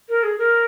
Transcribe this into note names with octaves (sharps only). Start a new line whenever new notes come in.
A#4
G#4
A#4